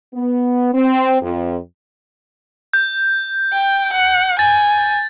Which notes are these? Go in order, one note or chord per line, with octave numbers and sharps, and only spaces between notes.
B3
C4
F2
G6
G5
F#5
G#5 A6